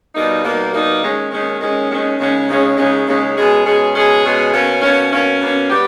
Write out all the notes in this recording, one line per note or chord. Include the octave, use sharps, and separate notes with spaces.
B2 G3 A#3 D#4
B2 G3 A#3 D#4
B2 G3 A#3 D#4
D#2 D#3 G#3 C#4
D#2 D#3 G#3 C#4
D#2 D#3 G#3 C#4
D#2 D#3 G#3 C#4
D#2 C#3 G#3 C#4
D#2 C#3 G#3 C#4
D#2 C#3 G#3 C#4
D#2 C#3 G#3 C#4
B2 G#3 C#4 G#4
B2 G#3 C#4 G#4
B2 G#3 C#4 G#4
B2 G#3 C#4 G#4
B2 A#3 C#4
B2 A#3 C#4
B2 A#3 C#4
B2 A#3 C#4
G3 B3 G4